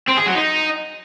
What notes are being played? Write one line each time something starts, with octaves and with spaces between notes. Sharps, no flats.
C4
G#4
F#3
D#4